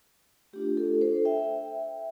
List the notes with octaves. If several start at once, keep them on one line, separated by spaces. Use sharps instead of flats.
A3 D4 F4 G4
A4
A4 C5
E5 G5